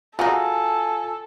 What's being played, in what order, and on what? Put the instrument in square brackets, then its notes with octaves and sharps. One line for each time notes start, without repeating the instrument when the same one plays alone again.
[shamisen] F#3 G#3 D#4 [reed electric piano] F4 [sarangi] A4 [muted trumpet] G#5